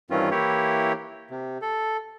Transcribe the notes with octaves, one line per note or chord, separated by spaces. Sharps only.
G2 D#3 E3 C4 C#4 F4
E3 A#3 E4 G4 C#5
C3
A4